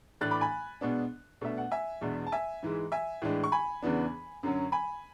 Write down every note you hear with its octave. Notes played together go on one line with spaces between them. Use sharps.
A2 E3 A3 D4 F#6 A6
B5 D6
G#5 B5
B2 G#3 B3 D4
B2 A3 D4 E5
F#5
E5 G#5
E2 B2 G#3 D4
A5
E5 G#5
G#2 E3 G#3
E5 G#5
A2 E3 G#3 D4
C#6
G#5 B5
E2 C#3 E3 B3 D4
F#2 D3 F#3 C#4
G#5 B5